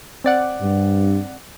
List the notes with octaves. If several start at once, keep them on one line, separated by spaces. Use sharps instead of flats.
C4 D5 F#5
G2